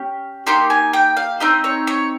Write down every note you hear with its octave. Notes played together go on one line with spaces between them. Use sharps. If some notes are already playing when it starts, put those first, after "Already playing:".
Already playing: C#4 G4
A#3 D#4 G4 C6
G#5
G5
F5
C4 D#4 G4 D#5
C#5
C#5